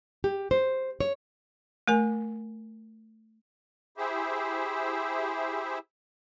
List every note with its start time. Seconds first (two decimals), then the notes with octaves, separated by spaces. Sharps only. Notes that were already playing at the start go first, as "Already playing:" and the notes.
0.24 G4
0.51 C5
1.00 C#5
1.88 A3 A#4 G#5
3.98 E4 G4 G#4 C5 E5